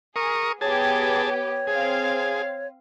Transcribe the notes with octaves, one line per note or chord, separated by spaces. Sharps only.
G#4 A#4 C#6 D#6
B3 G4 G#4 C#5 A5
C#5
C4 G#4 F5